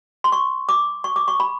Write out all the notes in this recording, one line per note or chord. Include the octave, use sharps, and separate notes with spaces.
C6
C#6
D6
C#6
D6
C#6
B5